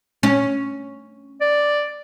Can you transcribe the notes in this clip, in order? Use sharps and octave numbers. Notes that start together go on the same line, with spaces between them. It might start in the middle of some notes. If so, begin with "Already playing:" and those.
C#4
D5